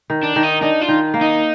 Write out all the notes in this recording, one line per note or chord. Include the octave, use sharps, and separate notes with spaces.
D#3
D4
D#3
D#4
D4 D#4
F4
D#3
A#3
D#4